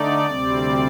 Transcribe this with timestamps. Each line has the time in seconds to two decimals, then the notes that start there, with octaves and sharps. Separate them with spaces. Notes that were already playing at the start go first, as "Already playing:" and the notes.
Already playing: D3 A3 D#4 D5
0.26 D2 C3 G3 C4